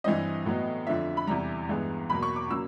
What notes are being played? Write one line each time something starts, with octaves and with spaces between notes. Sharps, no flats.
G2 E3 G3 C4 D#5
A2 F#3 B3
F2 D3 F3 E5
B5
E2 C3 E3 G3 A#5
G2 E3 G#3 B3
E2 B2 F#3 A#3 B5
C#6
D6
C#3 F#3 A#3 E6